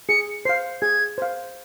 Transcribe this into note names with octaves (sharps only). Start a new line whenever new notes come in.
G#4 C#7
C5 F5 C7
G#4 G#6
C5 F5